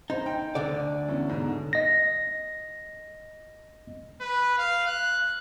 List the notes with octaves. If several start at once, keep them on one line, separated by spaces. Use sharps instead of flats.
D#4 C5
G5
D2 D3 D5
E2 C#4
G#2 B2
D#5 A#6
B4
F5
F#6